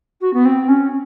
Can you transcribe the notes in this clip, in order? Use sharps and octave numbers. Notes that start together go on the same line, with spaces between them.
F#4
B3
C4
C#4